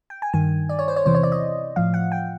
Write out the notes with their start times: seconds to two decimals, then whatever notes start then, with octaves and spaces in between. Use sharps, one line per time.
0.10 G5
0.22 G#5
0.33 G2 D#3 G#5
0.69 D5
0.79 C#5
0.88 C5
0.96 C#5
1.05 E2 C3 E3 C5
1.15 C#5
1.23 D5
1.32 D#5
1.76 A2 F3 F5
1.94 F#5
2.12 G5